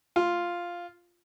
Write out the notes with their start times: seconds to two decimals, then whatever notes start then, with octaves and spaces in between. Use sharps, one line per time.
0.16 F4